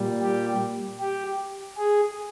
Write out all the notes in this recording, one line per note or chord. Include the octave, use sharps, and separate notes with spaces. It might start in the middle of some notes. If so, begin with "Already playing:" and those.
Already playing: A#2 G3
G4
G4
G#4